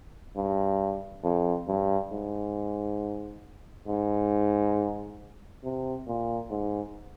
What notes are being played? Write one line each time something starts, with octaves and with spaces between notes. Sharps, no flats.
G2
F2
G2
G#2
G#2
C3
A#2
G#2